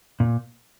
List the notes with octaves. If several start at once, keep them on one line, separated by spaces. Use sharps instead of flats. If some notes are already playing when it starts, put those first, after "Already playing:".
A#2